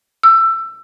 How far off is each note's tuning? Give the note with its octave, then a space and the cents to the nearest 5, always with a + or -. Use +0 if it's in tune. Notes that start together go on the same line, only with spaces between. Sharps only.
E6 +20